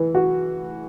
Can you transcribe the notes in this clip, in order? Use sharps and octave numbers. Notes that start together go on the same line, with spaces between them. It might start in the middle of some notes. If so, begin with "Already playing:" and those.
Already playing: E3
F#4